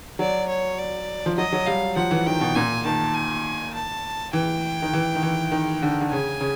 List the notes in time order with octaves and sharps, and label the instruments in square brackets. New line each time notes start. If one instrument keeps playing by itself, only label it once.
[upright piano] F#3 [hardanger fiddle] D5
[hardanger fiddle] C#5
D5
[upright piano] F3
[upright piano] F#3 [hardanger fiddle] D#5
[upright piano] F#3
[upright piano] G3 [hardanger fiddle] F5
[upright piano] F3 [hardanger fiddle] F#5
[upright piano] E3
[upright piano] D#3 [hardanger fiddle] G5
[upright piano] B2
[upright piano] A#2 [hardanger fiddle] G#5
[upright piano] D#3 [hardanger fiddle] A5
[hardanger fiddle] G#5
A5
[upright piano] E3 [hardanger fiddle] G5
[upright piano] D#3
E3
D#3
E3
D#3
D3
D3
[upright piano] C#3 [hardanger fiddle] G#5
[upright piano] C#3